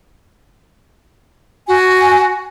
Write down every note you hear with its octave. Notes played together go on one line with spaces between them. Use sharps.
F#4 G#5